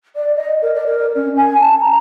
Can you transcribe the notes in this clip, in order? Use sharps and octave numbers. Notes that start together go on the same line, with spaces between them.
D5
D#5
A#4
D5
A#4
C#4
G#5
A5
A#5